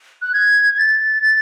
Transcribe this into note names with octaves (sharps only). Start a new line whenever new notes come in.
F#6
G#6
G#6
A6
A6